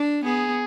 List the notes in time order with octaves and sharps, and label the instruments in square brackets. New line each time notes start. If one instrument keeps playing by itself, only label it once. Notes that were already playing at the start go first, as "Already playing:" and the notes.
Already playing: [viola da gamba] D4
[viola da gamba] B3 [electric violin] G#4